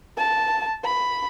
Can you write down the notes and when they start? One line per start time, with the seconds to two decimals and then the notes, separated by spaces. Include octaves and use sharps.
0.18 A5
0.85 B5